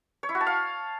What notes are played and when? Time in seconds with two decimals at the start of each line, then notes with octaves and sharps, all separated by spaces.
0.23 C#5
0.29 E4
0.35 F#4
0.41 A5
0.47 F5